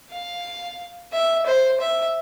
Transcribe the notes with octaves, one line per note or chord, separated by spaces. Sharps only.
F5
E5
C5
E5